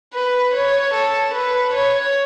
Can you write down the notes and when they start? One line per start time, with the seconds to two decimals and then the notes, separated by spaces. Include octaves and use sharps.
0.14 B4
0.54 C#5
0.94 A4
1.34 B4
1.74 C#5